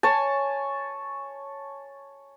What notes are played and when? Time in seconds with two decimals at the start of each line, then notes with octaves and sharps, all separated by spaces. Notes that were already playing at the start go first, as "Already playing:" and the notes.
0.03 C#5 G#5 A5